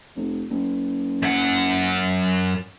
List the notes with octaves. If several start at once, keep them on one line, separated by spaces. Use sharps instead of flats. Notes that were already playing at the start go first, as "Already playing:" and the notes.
F1
F#1
F#2 F#5